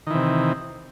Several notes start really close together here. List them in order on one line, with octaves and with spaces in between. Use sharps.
D#3 E3 C3